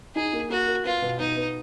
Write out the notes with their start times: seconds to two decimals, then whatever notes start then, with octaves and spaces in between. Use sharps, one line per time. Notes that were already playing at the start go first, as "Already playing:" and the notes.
0.16 D#4 G#4
0.33 A#3
0.50 A#3 F#4
0.67 A#4
0.85 B3 F4
1.02 B2
1.20 B2 D#4
1.36 B3